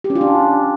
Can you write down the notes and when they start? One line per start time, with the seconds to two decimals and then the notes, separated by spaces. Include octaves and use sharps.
0.04 G4
0.10 C#4
0.15 F4
0.21 D4